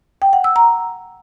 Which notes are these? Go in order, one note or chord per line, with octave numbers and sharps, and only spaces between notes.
G5
F#5
E6
A#5